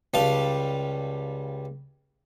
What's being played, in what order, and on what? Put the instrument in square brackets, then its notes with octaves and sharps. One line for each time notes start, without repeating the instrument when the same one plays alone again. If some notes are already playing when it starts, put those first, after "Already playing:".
[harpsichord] C#2 G3 F5 A5